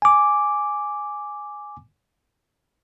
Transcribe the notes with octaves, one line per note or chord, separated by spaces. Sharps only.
G#5 D6